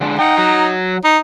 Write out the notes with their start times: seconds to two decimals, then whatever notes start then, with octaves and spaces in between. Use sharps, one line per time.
0.01 D3 G#3 D4
0.19 D#4 F#5 G5
0.38 F#3
1.04 D#4